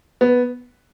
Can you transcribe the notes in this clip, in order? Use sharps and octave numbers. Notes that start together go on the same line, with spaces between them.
B3